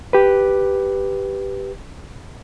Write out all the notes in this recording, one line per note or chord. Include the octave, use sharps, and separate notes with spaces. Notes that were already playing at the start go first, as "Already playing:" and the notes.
G4 B4